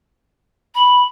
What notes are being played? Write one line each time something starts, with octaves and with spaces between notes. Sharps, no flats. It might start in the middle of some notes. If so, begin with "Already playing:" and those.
B5